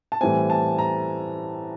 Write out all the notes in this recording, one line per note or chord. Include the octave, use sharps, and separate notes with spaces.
A5
A2 E3 G3 C4 G#5
A5
A#5